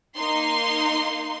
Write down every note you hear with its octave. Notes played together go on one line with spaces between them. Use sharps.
A#3 D#4 C6